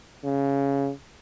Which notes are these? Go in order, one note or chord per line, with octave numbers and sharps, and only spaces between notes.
C#3